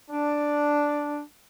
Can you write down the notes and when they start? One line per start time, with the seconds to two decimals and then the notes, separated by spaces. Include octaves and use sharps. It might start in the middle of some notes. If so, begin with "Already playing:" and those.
0.11 D4